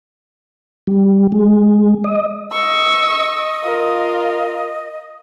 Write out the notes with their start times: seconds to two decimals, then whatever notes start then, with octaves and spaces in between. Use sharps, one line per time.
0.87 G3
1.32 G#3
2.04 D#5
2.52 D#5 C#6 E6
3.64 F4 A#4